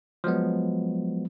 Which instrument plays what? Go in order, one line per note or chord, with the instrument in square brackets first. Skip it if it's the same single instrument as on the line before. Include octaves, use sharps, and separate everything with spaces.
[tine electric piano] F3 F#3 G#3 B3